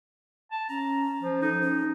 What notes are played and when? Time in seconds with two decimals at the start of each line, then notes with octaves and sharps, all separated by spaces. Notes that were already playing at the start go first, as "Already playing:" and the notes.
0.51 A5
0.69 C#4 A#5
1.22 F3
1.42 D#4 A4
1.62 C#4